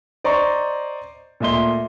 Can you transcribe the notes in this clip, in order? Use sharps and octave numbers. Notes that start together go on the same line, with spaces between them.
C5 D5 D#5 A#5 C6 C#6
A#2 A3 D#5 E5 C6 G7